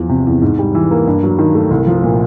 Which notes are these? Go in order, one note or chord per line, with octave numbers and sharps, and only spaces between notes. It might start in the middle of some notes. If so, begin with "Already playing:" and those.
Already playing: E2 F3
C3
E2
G#2
G3
E3
A#3
G2
F#3
D#3
A3
C2
F3
A#2